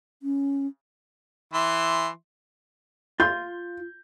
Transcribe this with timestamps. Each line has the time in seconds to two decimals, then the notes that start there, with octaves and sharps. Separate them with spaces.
0.23 C#4
1.54 E3 E5 C6
3.20 F4 C6 G6